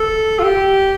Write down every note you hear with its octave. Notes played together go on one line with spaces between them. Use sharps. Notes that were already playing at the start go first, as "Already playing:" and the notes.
Already playing: A4
F4
G4